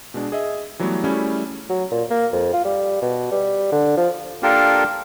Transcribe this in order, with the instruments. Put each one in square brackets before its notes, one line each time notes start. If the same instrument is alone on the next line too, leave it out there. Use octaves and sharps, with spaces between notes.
[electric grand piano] B2 G#3 D4
G#4 D#5 E5
E3 F#3 G3 A3 B3
G3 A3 C#4 E4 F#4 G#4
[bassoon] F#3
A#2
A#3
F2
F4
G3
B2
G3
D3
F3
[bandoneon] A#3 D4 F4 G4 A4 A#4